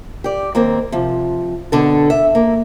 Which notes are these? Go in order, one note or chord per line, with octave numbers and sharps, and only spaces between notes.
G4 D5
D#2 A#3 C4
C3 F3
B2 D3 A4
E5
A#3